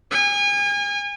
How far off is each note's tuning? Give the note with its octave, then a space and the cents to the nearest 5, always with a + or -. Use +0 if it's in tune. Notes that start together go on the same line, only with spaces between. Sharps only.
G#5 -35